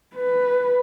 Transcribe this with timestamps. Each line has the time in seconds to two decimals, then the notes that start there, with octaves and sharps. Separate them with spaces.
0.16 B4